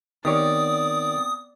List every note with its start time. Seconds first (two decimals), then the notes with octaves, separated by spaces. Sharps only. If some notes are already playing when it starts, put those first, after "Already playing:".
0.25 D#3 B3 C4 G4 C#5 D5 D#6 D7